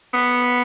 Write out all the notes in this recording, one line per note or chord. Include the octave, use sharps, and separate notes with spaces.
B3